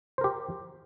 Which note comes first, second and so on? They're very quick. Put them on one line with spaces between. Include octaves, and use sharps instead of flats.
C5 A#4 G4